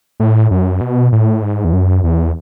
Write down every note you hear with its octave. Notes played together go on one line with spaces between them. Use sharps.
A2
F#2
B2
A2
G#2
E2
F#2
E2